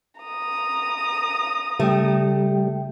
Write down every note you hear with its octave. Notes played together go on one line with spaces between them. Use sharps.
A#5 D#6
C#3 G3 A3 G5